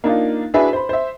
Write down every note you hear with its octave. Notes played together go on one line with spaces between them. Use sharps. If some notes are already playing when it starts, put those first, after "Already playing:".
A#3 D4 D#4 F4
D4 E4 F#4 G#4 B4 E5
C5 B5
C5 E5